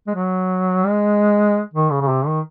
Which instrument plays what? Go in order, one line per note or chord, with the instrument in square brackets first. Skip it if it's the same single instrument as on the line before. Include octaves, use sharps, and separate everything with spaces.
[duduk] G#3
F#3
G#3
D#3
C#3
C#3
C3
D#3